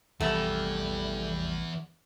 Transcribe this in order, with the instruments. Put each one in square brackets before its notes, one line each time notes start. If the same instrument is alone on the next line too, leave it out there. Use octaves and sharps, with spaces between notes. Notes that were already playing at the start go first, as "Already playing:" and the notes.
[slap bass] A1 C3 F3 [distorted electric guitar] E3 B3 [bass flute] G3 [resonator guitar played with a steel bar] A3 E5